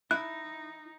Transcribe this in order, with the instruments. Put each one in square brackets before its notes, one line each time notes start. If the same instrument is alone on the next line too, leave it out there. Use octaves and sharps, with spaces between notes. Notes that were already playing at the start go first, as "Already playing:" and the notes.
[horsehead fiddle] D#4 [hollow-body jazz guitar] E4 [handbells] F#6